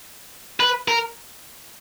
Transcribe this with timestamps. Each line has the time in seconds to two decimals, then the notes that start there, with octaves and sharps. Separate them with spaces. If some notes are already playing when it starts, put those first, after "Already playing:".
0.60 B4
0.88 A#4